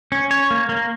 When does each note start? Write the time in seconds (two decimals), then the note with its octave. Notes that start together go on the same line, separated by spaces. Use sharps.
0.12 C#4
0.31 C#5
0.51 A#3
0.69 A#3